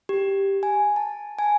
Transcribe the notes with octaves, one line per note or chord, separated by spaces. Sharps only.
G4
G#5
A5
G#5